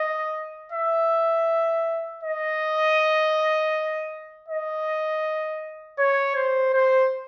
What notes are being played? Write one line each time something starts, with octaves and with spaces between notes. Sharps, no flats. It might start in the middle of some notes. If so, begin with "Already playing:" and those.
Already playing: D#5
E5
D#5
D#5
C#5
C5
C5